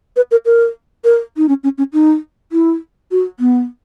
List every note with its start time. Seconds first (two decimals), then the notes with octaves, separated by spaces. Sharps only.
0.16 B4
0.31 A#4
0.46 A#4
1.04 A#4
1.37 D#4
1.49 C#4
1.63 C#4
1.78 C#4
1.93 D#4
2.52 E4
3.11 F#4
3.40 B3